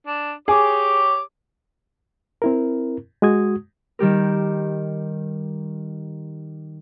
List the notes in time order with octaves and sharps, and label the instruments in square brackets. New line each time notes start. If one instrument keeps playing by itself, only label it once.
[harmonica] D4
[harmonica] G4 C#5 D6 [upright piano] G#4
[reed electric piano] C4 E4 A#4
G#3 F#4 D#6 G#6
[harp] D#3 G3 G4 A#4